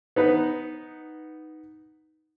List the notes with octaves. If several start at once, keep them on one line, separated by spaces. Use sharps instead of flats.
B3 D#4 B4